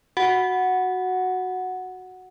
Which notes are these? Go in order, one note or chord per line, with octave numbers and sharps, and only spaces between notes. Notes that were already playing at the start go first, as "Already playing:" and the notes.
F#4 F#5